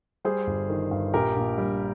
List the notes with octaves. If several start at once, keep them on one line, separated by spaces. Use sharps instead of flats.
G3 G#4 C5
G1
D#3
G2
A#1 G4 A#4
A#1
G3